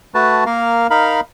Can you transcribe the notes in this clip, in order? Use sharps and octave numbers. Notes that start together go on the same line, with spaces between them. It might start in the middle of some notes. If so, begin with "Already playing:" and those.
A3 F#4 B4 A5
A#3 A#4 F5
D#4 A#4 F5 B5